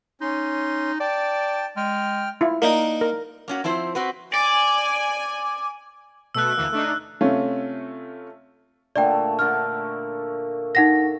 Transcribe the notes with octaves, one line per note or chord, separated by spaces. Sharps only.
C#4 D#4 C6
D5 G5 A5
G#3 G5 F6
E4 F4
A#3 D4 D#4 A#4
A#4
A#3 C#4 F#4
F3 C4 E4 C5
C4 F#4 B4
D5 G#5
B2 A3 E6 F#6
D2 E3 A#3
A3 D4 D#4
C3 A3 C#4 F4
A#2 D3 A3 D5 G5
A#2 D3 A3 F6
D#4 F#5 A#6